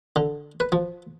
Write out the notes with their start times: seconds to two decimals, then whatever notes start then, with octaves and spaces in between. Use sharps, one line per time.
0.16 D3
0.60 B4
0.72 F3